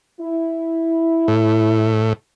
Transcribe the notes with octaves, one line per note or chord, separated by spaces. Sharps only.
E4
A2